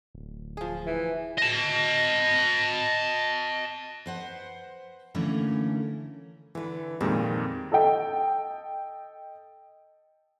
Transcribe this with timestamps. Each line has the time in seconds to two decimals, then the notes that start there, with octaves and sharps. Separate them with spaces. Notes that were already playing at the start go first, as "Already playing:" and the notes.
0.15 D1
0.57 F3 G#4
0.87 E3
1.38 D#5 A5
4.06 B4 C5 F#5
5.15 D3 E3 A3 A#3 C#4 A#4
6.55 D3 E3 B4
7.01 F2 A#2 D#3 G#3 C4 G4
7.72 A4 D#5 G5